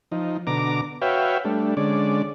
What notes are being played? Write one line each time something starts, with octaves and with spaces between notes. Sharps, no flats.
F3 D#4
B2 D3 A#5 D6
F#4 B4 C#5 E5 F5 G5
G3 A3 D4
D3 G#3 C#4 D5